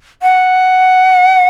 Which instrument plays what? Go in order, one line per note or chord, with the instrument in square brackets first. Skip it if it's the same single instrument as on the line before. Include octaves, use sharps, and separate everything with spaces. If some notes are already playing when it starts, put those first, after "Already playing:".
[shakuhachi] F#5